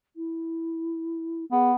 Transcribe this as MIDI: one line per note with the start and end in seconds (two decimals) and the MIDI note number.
0.16 1.45 64
1.52 1.75 59
1.52 1.71 68